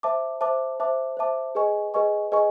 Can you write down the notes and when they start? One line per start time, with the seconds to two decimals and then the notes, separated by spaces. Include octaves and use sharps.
0.03 C5 E5 A5 D6
0.41 C5 E5 A5 D6
0.80 C5 E5 A5 D6
1.17 C5 E5 A5 D6
1.55 G#4 B4 D#5 G#5 C#6
1.94 G#4 B4 D#5 G#5 C#6
2.32 G#4 B4 D#5 G#5 C#6